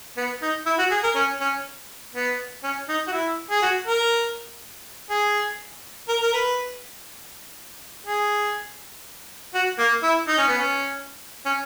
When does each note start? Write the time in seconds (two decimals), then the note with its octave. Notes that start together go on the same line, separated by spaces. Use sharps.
0.17 B3
0.42 D#4
0.66 E4
0.78 F#4
0.91 G#4
1.04 A#4
1.15 C#4
1.41 C#4
2.15 B3
2.63 C#4
2.89 D#4
3.08 F#4
3.12 E4
3.51 G#4
3.62 F#4
3.87 A#4
5.10 G#4
6.08 A#4
6.22 A#4
6.33 B4
8.06 G#4
9.54 F#4
9.78 A#3
10.03 E4
10.28 D#4
10.38 C#4
10.48 B3
10.58 C#4
11.46 C#4